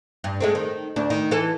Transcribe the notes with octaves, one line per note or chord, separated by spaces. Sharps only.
G2
G#3 A3 C4
D#3
D2 D4
D#3
E3 A4